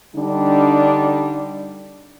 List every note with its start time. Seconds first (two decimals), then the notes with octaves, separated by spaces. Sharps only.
0.16 D3 G3 D4 D#4